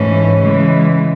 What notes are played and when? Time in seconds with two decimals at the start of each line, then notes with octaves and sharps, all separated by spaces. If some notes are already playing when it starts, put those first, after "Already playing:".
Already playing: G#2 E3 A3 C#4
0.40 C#3 E3 G#3